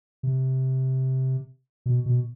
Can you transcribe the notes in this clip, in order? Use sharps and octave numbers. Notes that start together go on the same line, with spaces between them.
C3
B2
B2